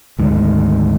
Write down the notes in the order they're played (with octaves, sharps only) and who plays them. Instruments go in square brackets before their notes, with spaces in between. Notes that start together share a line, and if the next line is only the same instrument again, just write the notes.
[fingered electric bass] D2 G#2 D#3